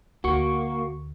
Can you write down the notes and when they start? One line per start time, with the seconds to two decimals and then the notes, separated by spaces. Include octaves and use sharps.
0.24 D2 A#3 F#4 C#6